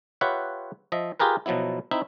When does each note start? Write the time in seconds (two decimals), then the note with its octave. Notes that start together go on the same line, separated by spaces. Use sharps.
0.21 F4 G4 B4 C#5 E5 F#5
0.92 F3 D#5 E5
1.19 F4 G4 G#4 A#4 B4
1.46 B2 F3 F#3 B3 E4
1.91 C4 D#4 E4 E5